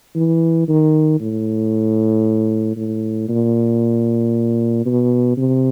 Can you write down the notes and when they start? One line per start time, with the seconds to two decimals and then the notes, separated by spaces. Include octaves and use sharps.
0.16 E3
0.68 D#3
1.20 A2
2.77 A2
3.29 A#2
4.86 B2
5.37 C3